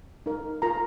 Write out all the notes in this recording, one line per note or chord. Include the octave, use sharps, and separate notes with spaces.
D#4 A#4
F4 A#4 A#5